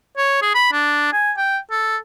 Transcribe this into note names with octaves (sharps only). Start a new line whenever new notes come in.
C#5
G#4
B5
D4
G#5
G5
A4